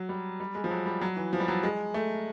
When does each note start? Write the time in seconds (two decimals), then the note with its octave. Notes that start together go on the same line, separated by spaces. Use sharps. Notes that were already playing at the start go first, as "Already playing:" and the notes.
Already playing: F#3
0.09 G3
0.40 G3
0.55 G#3
0.64 F3
0.71 F#3
0.86 G3
1.01 F#3
1.17 E3
1.33 F3
1.40 G3
1.48 F#3
1.63 G#3
1.94 A3